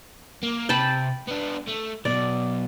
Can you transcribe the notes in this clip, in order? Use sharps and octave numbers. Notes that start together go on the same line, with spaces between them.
A#3
C3 G5 A5 B5
B3 D4
A3
B1 B2 D5